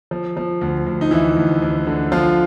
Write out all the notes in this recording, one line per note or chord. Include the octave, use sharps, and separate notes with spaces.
F3
F3
D2
D2
D#4
D2 E3 E4
D2
D2
D3
F3 F4